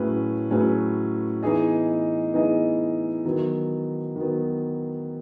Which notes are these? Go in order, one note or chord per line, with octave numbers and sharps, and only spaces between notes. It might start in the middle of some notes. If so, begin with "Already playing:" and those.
Already playing: A2 F#3 C#4 G#4 B4
A2 F#3 C#4 G#4 B4
E3 B3 D#4 G#4 D#5
E3 B3 D#4 G#4 D#5
D#3 F#3 B3
D#3 F#3 B3